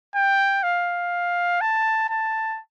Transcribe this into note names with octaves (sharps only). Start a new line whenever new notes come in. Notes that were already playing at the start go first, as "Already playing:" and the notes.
G5
F5
A5
A5